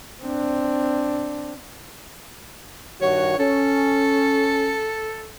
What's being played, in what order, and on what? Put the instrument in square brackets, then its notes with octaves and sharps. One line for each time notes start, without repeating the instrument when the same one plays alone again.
[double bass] C4 D4
[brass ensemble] G2 D#3 F#4 [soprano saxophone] C#5
[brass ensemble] C#4 [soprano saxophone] A4